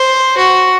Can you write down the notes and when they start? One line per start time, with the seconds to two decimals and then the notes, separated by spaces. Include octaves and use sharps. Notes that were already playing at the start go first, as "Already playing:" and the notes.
Already playing: C5
0.37 F#4